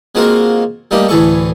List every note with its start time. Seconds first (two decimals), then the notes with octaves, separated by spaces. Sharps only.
0.15 G#3 A#3 C4 F4 F#4 A#4
0.91 G3 A3 A#3 D#4 G4
1.08 D2 A2 E3 G#4 A4 C#6